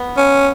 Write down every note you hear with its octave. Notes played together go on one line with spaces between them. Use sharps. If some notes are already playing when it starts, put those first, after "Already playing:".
Already playing: B3
C#4